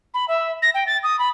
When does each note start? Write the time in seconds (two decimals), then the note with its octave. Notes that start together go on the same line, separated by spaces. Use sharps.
0.14 B5
0.28 E5
0.62 A#6
0.74 G5
0.87 A6
1.03 D#6
1.19 B5